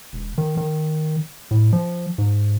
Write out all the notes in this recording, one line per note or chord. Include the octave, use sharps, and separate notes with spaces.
E1
D#3
D#3
A2
F3
G#2